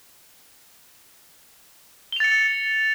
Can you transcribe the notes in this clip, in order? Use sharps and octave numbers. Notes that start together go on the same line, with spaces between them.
A6 C#7 F7 G7